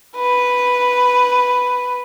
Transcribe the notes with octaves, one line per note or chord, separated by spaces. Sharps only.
B4